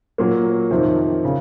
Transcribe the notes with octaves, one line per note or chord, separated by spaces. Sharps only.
A#2 F#3 A#3
F2 C3 D#3
C#3